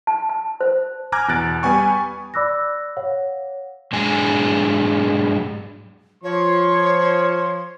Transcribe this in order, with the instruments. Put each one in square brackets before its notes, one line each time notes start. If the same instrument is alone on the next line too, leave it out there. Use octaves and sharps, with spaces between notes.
[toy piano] A5
A5
C5
[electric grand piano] G#5 A#5 D6 F6 F#6 G#6
E2 B2 F#6 A6 D7
G3 B3 G#5 C#6
[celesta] D5 B5 D6 E6 F#6 A#6
C#5 F5 F#5
[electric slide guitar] G#2 F#3 G#3 D4 G#5
[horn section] F3 [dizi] C#5 [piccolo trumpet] C6